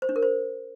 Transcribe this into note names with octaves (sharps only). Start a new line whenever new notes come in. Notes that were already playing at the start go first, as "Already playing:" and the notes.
C5
D4
A#4
C5